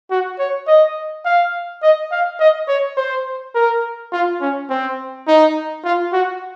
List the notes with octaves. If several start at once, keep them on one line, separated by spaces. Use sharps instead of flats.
F#4
C#5
D#5
F5
D#5
F5
D#5
C#5
C5
A#4
F4
C#4
C4
D#4
F4
F#4